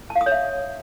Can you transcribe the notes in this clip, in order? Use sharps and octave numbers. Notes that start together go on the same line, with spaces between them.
A5
F5
D#6
C#5
E5